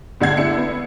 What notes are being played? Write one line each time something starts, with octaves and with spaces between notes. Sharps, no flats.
G1 D3 F#5 G#6 C7
D3 D4 E4 C#7
B3